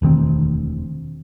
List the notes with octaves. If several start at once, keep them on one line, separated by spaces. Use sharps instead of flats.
E1 D2 D#3 C4